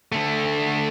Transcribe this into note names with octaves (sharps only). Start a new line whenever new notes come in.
D3 A3